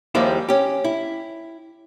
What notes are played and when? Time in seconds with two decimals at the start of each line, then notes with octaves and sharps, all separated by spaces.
0.15 D#2 F3 G3 G#3 A#3 E4
0.49 C#4 G4
0.84 E4